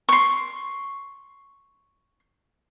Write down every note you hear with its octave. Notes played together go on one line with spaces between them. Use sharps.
C6 C#6